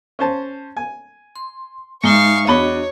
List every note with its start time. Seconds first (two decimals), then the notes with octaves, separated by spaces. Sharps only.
0.19 C#4 C5 A5
0.77 G#5
1.36 C6
2.04 G#2 G#3 D#4 E5 F5 C#6
2.47 E2 D4 F#4 C#5 D#5 B5